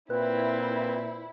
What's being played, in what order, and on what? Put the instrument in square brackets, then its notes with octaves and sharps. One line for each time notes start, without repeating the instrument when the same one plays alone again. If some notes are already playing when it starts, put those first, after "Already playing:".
[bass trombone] A#2 [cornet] C4 [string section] E4 [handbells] B4